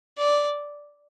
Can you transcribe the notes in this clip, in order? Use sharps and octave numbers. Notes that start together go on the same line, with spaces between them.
D5